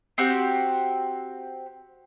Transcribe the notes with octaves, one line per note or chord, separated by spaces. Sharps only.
C4 F#4 G4